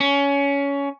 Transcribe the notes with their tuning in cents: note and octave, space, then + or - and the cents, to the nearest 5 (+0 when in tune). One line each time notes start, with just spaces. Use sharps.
C#4 +20